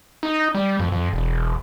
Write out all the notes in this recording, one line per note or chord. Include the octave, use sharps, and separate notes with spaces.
D#4
G3
F2
F2
E1